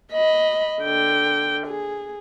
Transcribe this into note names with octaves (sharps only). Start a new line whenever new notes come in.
D#5 B5
D3 G5
G#4